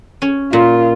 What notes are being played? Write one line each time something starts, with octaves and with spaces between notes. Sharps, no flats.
C#4
A#2 F4